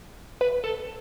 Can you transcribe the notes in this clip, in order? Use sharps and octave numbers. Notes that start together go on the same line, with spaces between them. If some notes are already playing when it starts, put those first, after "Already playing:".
B4
A4